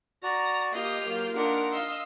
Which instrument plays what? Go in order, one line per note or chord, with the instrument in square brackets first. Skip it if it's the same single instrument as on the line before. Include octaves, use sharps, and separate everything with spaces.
[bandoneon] F#4 D5 [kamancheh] A#5
[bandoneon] A#3 [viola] F4 G4 [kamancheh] D#5
[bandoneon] F#3 [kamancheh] A#3
[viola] D4 A#4 [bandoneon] D#4 F4 F#5
[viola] D#5 C6 [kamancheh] F5 E6